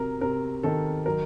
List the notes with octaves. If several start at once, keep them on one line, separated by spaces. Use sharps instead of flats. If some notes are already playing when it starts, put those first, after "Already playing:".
Already playing: C3 F#3 A#4
C3 A#4
D#3 A4
F#3 A#4